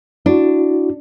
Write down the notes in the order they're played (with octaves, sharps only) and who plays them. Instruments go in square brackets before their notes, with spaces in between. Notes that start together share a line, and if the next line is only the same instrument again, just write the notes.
[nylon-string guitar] D4 [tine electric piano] E4 F#4